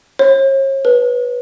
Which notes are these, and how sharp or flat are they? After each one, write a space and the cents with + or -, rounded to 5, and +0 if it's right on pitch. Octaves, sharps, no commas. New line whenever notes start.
C#5 -40
B4 -20